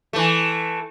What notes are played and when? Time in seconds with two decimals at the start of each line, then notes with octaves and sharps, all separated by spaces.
0.13 E3 A3